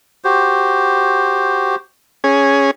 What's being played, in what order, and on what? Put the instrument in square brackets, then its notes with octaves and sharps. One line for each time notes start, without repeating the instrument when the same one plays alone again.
[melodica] F#4 G4 C5
[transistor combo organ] C#4 G#4